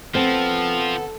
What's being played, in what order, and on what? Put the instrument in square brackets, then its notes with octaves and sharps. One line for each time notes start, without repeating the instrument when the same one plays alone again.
[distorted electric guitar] F3 [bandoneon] B3 [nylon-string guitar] C4 [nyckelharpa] A4